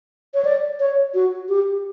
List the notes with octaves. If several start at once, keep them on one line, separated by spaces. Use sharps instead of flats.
C#5
D5
C#5
F#4
G4